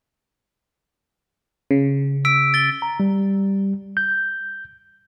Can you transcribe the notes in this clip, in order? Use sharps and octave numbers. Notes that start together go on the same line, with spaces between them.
C#3
E6 B6 D7
A6 G7
A#5
G3
G6